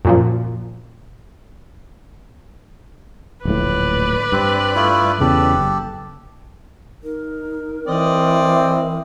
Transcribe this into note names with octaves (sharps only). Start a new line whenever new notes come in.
F#2 A#2 F3
D1 A#1 A2 B4 D5
G2 C4
A3 E4 F4
E2 C#3 E3 G4 A4
F#1
D#4 A#4
E3 C4 D5 D#5